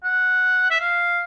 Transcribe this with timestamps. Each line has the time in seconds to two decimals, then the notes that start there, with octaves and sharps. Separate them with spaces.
0.04 F#5
0.70 E5
0.80 F5